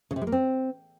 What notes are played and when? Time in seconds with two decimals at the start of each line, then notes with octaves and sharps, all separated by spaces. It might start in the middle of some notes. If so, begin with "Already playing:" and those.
0.11 C#3
0.16 C3
0.22 G#3
0.27 A#3
0.32 C4